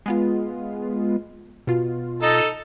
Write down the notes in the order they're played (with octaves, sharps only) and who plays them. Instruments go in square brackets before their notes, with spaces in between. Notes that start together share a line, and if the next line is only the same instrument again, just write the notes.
[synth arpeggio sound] G#3 B3 F4
B2 F4
[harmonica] D#4 A4 A5